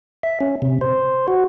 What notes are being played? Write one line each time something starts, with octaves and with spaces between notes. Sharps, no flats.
E5
C#4
C3
C5
F#4